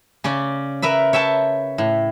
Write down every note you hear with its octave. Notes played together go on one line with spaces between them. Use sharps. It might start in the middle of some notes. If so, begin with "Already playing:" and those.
C#3 C#4 D5
A#4 B4 E5 B5
C#5 E5 G5 A5
A2